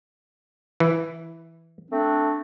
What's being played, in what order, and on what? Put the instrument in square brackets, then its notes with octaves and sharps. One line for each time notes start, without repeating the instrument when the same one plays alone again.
[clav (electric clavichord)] E3
[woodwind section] A3 C4 D4